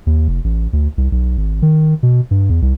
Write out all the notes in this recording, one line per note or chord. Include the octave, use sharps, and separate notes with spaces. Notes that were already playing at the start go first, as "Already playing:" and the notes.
D#2
F1
A1
D2
C2
B1
G#1
D#3
B2
G2
E2
C2